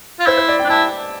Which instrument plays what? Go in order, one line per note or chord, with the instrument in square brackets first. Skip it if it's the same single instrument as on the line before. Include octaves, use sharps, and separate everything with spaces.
[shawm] F4
[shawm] E4 [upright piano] C5
[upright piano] C5
D5
G5
[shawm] D4
[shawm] E4 [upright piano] A5